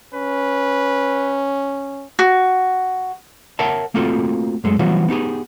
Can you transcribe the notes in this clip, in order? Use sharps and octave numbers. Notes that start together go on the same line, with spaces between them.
C#4 B4
F#4
A#4 C#5 E5 F#5 A5
A3 A#3 C4 F4 F#4 A4
F#2 G#3 A3
E3 F#3 G3 B3 F4 F#4
B3 D#4 G4 G#4